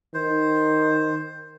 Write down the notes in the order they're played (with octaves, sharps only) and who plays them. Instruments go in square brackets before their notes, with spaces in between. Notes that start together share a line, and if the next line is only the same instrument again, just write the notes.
[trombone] D#3 [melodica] C5